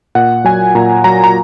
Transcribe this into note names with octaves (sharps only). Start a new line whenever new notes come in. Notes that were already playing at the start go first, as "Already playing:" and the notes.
A#2 F#5
F#3 G#5
A#2 A#5
F#3 A#5
A#5